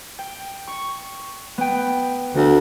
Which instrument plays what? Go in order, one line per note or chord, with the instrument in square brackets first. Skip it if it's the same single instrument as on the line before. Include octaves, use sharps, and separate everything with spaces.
[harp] G5
C#6
B3 G5
[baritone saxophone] D2 [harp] D3